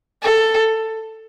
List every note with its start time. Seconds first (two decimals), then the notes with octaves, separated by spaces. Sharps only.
0.22 A4